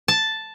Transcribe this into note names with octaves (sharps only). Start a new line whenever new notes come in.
A5